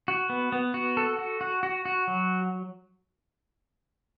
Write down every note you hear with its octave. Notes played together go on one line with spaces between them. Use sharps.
F#4
B3
B3
F#4
A4
F#4
F#4
F#4
F#4
F#3